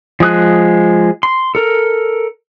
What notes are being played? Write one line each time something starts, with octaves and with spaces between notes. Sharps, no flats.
F3 G#3 D#6 F#6
C6
A4 A#4